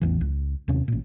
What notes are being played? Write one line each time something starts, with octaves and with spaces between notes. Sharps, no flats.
A1 E2 E3
C#2
D#2 C3 C#4
A1 A#2